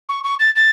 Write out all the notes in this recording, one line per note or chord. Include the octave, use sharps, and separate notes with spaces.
C#6
C#6
A6
A6